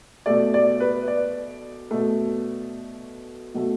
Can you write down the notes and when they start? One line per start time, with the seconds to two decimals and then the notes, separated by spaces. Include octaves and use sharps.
0.26 B2 A3 D5
0.54 D5
0.80 B4
1.08 D5
1.91 B2 A3
3.54 B2 F#3 A3